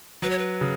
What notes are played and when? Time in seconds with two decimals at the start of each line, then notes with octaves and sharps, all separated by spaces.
0.22 F#3 B4
0.30 C#5
0.38 B4
0.61 C#3